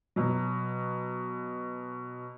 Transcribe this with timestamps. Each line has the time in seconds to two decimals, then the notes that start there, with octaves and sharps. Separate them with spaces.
0.16 B2 F#3